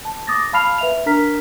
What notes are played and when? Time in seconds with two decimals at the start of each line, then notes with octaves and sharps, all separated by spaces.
0.05 A5
0.27 D6 D#6 A6 A#6
0.53 F5 A5 B5 F6 C7 F7
0.78 B4 E5 F7
1.06 D4 A#4 A#5 F6 B6